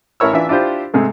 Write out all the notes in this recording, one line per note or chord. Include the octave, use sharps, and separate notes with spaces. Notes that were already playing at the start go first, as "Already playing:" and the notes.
A1 E4 A#4 C#5 E6
E3 D4 F4 E5
D4 E4 F4 G4 C5
G#2 C3 G#3 A3